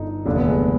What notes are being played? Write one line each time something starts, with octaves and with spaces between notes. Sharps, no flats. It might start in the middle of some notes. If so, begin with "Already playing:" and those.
Already playing: G1 G2 D3 D#4
F1 D#2 D3 D4
B3
G#3